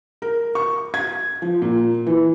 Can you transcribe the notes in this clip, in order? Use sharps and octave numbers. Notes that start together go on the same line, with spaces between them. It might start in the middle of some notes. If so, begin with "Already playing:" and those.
A#4
C#6
G#6
F3
A#2
E3